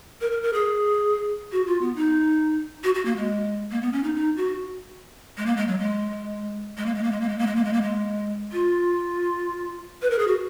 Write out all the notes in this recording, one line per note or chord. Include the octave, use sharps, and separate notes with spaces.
A#4
A#4
A#4
G#4
F#4
F4
B3
D#4
F#4
F#4
A#3
G#3
A#3
B3
C#4
D#4
D#4
F#4
G#3
A#3
G#3
F#3
G#3
G#3
A#3
G#3
A#3
G#3
A#3
G#3
A#3
G#3
A#3
G#3
A#3
G#3
F4
B4
A#4
G#4
F#4